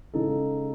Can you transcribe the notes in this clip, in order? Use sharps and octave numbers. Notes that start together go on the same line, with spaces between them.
C#3 G#3 D#4 A4